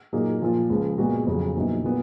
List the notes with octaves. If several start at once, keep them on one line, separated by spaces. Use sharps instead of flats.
A#2 F#3 A#3 D#4 G#4
A#2 F3 A#3 F4
C#2 C#3 F3
A#2 G#3 B3 F#4
F2 C#3 F#3
A#1 A#2 F#3 B3 D#4
A#2 F#3 B3